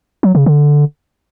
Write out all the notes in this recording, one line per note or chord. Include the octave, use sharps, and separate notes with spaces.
F#3
C#3
D3